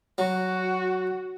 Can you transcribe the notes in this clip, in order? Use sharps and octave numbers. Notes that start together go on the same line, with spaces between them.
F#3 F#4